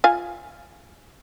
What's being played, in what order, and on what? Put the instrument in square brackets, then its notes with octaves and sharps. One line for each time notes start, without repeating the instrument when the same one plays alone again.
[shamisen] F4 F5 G#5